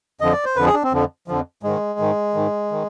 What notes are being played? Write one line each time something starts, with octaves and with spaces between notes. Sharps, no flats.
F2 D3 F3 D#5
D5
C5
F2 D3 F3 B4
G#4
D4
C4
F2 D3 F3
F2 D3 F3
G#2 D#3 G#3
G#2 D#3
G#2 D#3
D#3